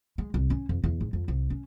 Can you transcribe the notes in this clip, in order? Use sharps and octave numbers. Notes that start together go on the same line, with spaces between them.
G#3
C2
C#4
F2
E2
G#2
F2
C2
C#4